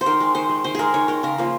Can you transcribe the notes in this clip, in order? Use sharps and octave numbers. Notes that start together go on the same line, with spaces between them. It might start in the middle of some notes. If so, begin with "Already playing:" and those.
C5
D#3 A#4
G#3
D#3 C5
G#3
D#3 C5
G#3 G#4 A#4
D#3 C#5
G#3 A#4
C#3 A#4
F3 A#3